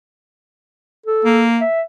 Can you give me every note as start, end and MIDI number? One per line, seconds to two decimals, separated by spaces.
1.06 1.44 69
1.25 1.62 58
1.61 1.82 76